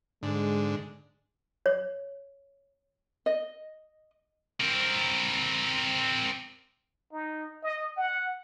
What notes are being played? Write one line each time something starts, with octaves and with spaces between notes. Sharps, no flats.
G#2 D3 G#3
C#5
D#5
C4 A#4
D#4
D#5
F#5